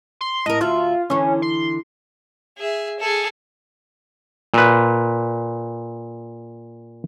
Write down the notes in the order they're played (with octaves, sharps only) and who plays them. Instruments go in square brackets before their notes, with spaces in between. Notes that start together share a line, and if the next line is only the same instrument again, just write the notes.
[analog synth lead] C6
[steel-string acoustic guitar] A2 A#4 [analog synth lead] D#5
[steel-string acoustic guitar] D2 F#4 E5 [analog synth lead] F4
[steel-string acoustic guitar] D3 E3 [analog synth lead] C#4
[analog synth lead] C6
[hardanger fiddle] G#4 E5
G#4 A4
[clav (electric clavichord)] A#2 B4